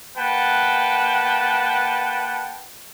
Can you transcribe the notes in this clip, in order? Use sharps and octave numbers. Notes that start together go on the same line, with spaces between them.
A#3 B4 F#5 G5 A5